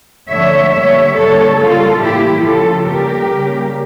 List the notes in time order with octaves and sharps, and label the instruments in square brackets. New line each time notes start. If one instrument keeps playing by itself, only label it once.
[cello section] D3 F3 A3 C#5 E5
D3 G3 A#3 C#5 E5
D3 G3 A#3 A4 C#5
C#3 G3 A#3 F4 A4
A2 E3 A#3 E4 G4
C#3 F3 A3 F4 A4
C#3 G3 A#3 G4 A#4
C#3 G3 A#3